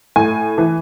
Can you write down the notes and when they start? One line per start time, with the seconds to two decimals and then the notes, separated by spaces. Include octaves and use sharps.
0.16 A2 G#5
0.58 E3